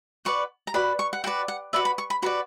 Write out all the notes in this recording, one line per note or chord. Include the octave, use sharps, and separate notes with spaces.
F#4 B4 D5 C#6
A#5
F#4 B4 D5 B5
C#6
F#5
F#4 B4 D5 G5
F#5
F#4 B4 D5 E5
B5
C#6
B5
F#4 B4 D5 B5